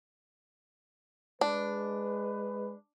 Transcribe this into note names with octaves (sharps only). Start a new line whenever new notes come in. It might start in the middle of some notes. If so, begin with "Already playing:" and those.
G#3 D4 B4